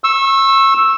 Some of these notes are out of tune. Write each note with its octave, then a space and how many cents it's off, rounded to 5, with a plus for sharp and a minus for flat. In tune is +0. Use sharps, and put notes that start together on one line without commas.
C#6 -30 E6 +0